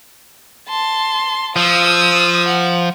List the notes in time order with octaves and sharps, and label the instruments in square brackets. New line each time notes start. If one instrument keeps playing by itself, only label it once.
[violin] A5 C6
[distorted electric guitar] F3 [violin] D#6 E6
[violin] F#5